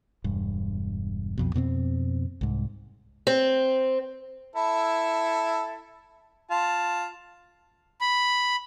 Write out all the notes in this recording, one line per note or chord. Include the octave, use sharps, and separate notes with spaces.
E1 G2
B1 F2 B2
F2 B2 A#3 C4
C2 G#2
C4
E4 A4
F4 A5
B5